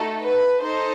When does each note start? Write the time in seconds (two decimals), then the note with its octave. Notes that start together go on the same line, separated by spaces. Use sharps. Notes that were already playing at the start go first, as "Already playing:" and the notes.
Already playing: A3 D#4 F#4 A4
0.22 B4
0.62 D#4 A4 C5